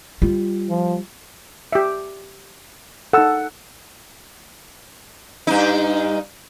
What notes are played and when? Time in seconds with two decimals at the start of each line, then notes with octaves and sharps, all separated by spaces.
0.22 G3 F4
0.69 F3
1.72 G4 E5
3.13 D#4 A4 F#5 E6
5.47 G2 D#4